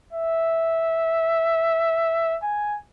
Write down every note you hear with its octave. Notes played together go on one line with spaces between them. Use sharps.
E5
G#5